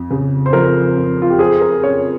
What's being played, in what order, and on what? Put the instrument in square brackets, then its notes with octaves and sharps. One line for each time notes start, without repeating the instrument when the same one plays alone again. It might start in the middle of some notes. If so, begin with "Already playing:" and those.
Already playing: [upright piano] F2
C#3
[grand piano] C5
[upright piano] F3 [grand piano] A#4
[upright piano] F2
[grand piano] F4
G4
[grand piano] G#4 [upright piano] C5
[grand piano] A#4
[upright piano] C#4 [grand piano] C#5